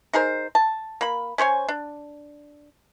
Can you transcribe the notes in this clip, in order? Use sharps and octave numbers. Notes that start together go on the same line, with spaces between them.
D#4 G#4 A#4 C5
A5
A#3 B5
C#4 C5 C#5 G#5
D4